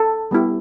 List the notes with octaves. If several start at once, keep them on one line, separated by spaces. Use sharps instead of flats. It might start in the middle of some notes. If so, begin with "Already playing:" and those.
Already playing: A4
G3 B3 E4 G4